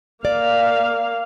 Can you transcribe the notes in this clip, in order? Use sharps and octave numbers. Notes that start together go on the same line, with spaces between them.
A#3 D5 F5